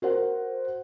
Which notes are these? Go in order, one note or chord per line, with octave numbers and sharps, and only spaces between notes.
F#4 A#4 C5 F#5